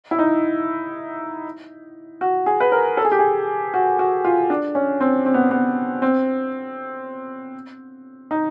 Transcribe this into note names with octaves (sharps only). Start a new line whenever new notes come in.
E4
D#4
F#4
G#4
B4
A#4
A4
G#4
G4
G#4
F#4
F#4
F4
D4
C#4
C4
C4
B3
B3
C4
D#4